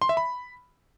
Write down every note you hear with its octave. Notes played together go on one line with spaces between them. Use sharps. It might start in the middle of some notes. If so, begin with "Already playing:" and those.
C6
E5
B5